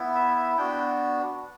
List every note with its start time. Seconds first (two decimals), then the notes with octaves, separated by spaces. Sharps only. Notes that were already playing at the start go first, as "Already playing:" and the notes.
Already playing: B3 E4
0.15 E5
0.36 E5
0.57 B3 D4 F#4 G5